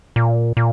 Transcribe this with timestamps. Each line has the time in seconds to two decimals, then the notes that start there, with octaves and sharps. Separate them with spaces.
0.16 A#2
0.57 A#2